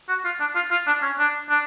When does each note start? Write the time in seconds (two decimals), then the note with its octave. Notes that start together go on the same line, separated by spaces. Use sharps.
0.08 F#4
0.25 F4
0.40 D4
0.55 F4
0.71 F4
0.87 D4
1.02 C#4
1.19 D4
1.49 D4